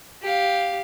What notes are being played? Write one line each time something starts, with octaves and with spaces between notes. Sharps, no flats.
G4 F5